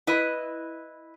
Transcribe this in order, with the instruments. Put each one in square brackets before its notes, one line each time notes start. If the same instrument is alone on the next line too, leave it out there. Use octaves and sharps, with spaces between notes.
[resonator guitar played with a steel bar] E4 B4 D#5